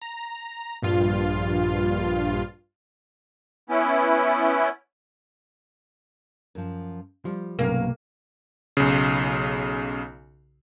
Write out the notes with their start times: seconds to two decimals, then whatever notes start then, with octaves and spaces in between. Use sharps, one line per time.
0.02 A#5
0.82 A#1 G2 F4
3.70 B3 C#4 E4
6.55 F#2 F3
7.25 F3 G3
7.59 B1 G2 C3 F#3 A#3 C#4
8.77 B1 C#3